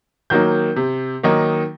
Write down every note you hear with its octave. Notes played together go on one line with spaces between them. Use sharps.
D#3 F#3 A#3 D#4 G6
C3
D#3 F#3 A#3 D#4